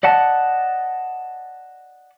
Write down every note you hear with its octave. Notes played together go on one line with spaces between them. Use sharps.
D5 D#5 F#5 A5